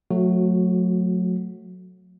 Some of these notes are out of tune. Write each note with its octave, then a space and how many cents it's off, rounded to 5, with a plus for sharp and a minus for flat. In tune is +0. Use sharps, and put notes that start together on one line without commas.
F#3 -30 A3 +0 F#4 +0